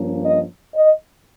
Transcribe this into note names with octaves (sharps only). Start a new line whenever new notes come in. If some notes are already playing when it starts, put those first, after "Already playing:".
Already playing: G2 F3 A#3 C#4
D#5
D#5